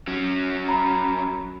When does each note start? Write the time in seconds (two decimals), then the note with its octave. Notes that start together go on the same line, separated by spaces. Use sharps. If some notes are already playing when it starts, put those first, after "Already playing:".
0.07 F#3 C#4
0.69 A#5 B5